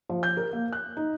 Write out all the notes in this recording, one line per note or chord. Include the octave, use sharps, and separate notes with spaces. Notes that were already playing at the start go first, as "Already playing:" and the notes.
F3
G6
A#4
A#3
F#6
D#4